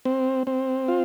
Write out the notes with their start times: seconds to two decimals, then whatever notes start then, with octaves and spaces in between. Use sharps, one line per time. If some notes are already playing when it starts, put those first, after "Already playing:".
0.05 C4
0.47 C4
0.88 F4